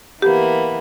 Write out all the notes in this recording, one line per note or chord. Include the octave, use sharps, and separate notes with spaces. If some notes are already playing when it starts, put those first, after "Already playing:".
E3 A#3 B3 G4